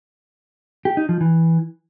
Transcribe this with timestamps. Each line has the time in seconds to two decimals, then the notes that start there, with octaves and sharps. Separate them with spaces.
0.85 G4
0.97 D#4
1.09 F3
1.21 E3